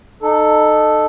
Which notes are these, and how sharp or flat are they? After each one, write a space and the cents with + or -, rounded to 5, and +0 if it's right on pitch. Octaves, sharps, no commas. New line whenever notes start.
D#4 -25 A4 +0